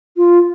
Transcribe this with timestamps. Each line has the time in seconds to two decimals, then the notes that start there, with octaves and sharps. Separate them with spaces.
0.16 F4